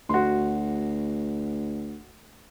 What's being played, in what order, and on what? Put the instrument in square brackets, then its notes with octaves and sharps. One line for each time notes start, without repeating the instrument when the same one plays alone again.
[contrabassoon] D2 [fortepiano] F#4 C6